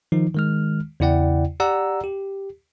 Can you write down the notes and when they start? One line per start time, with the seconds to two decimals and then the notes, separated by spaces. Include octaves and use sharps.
0.12 D#3 F3 D#4
0.35 D#3 G#3 F6
1.00 E2 C#3 E4 D5 F#5 G5
1.60 G4 D5 F#5 A#5 E6
2.04 G4